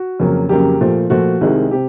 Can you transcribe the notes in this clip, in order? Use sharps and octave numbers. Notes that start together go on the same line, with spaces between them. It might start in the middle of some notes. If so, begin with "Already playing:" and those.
Already playing: F#4
F2 C#3 F#3 A#3 C#4
F2 C#3 F#3 A#3 C#4 G4
A#2 F3 A3
A#2 F3 A3 F#4
C2 C3 D#3 G#3
C3 G4